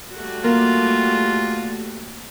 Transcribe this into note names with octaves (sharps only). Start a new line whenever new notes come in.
G3 A3 F#4
A#3 F4